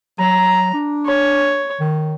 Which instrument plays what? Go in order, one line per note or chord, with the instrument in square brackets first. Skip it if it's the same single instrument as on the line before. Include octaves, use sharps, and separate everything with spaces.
[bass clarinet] F#3 [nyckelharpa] A#5
[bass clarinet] D4
[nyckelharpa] C#5
[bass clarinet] D#3